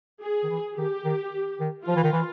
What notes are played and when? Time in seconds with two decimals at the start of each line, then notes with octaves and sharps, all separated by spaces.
0.23 G#4
0.43 D#3
0.50 E3
0.77 D#3 G4
1.05 D#3
1.60 D#3
1.87 F3 F4
1.96 E3
2.04 D#3
2.13 E3